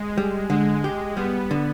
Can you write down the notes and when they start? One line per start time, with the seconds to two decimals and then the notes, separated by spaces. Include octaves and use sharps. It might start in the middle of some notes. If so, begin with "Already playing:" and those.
Already playing: G#3
0.18 G3
0.50 D3 G#3
0.84 G4
1.17 G3 B3
1.51 D3